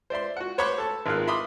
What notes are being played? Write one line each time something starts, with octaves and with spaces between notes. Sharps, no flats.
C5 D5 E5 C6
F#4 F#5
C5 C#5 F#5 B5 C#6 D6
A4 A5
G#1 G#3 F4 A#4 F5 F#6
E5 B5 C6 D6 D#6